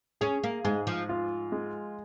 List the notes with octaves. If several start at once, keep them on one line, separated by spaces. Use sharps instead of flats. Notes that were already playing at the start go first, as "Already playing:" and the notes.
C#4 G#4
A#3
G#2 G#3
F3
F4
G#3